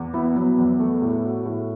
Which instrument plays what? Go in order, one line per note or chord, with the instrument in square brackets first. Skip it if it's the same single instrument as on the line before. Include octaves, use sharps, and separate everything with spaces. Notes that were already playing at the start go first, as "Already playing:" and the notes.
Already playing: [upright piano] E2
[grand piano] B3 [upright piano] E4
[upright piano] F#3 [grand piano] B3
[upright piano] E2
A3
A2
F#4
A2